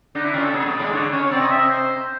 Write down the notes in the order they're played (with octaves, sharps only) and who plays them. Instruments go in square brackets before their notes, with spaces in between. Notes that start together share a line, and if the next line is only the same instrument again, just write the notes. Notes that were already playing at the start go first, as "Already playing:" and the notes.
[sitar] D3 D4 [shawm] D#4
[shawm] E4
[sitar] C#3 C#4 [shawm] F4
[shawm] A4
[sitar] B2 B3 [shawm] G#4
[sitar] A2 A3
[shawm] D5
[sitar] G#2 G#3
[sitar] D3 D4 [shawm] C#5
[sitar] C#3 C#4 [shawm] C#5
[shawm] C#5
[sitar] C3 C4 [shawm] D5
[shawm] D#5
E5
D#5
C5